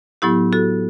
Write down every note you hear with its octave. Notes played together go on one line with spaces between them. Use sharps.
A2 F#3 B3 E4 G4
F#4 A4